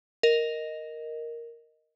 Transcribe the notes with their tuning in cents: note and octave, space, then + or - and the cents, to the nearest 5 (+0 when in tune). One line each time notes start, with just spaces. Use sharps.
A#4 +0 D#5 +0